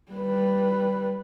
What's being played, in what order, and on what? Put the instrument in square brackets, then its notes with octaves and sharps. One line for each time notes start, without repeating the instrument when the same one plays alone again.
[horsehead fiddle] G3 B4